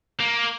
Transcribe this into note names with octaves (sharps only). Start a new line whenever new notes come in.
A#3